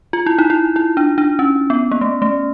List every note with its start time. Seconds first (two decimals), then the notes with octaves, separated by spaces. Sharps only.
0.13 F4
0.26 E4
0.38 D#4
0.50 E4
0.76 E4
0.97 D4
1.18 D4
1.39 C#4
1.70 B3
1.91 A#3
2.01 A3
2.22 A3